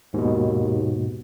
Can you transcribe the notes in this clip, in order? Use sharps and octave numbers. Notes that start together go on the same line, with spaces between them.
D#2 G#2 B2